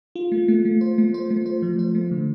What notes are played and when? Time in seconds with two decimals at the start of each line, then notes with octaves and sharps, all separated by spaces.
0.15 F4
0.32 A3
0.48 A3
0.65 A3
0.81 C5
0.98 A3
1.14 C5
1.30 A3
1.46 C5
1.62 F3
1.79 C5
1.95 A3
2.11 D3